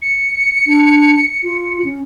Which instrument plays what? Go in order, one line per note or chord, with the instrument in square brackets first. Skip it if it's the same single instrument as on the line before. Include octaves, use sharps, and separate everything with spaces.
[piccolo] C#7
[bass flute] D4
F4
C#4